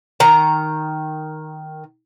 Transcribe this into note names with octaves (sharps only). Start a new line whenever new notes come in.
D#3 A#5